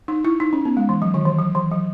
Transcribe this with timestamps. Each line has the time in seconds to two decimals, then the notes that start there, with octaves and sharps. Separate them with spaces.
0.08 D#4
0.25 E4
0.40 D#4
0.53 C#4
0.65 B3
0.77 G#3
0.89 E3
1.02 F#3
1.14 D#3
1.25 E3
1.39 F#3
1.55 E3
1.71 F#3